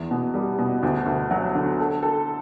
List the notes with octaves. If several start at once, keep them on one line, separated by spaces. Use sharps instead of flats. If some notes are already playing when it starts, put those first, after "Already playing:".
Already playing: E2
B2
G3
B2
D2
D2
F#3
D3
A4
A4